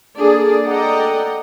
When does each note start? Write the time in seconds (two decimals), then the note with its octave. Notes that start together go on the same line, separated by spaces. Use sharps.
0.15 A#3 D4 G#4 A4 D5
0.65 A4 D5 D#5 F#5 G5 A#5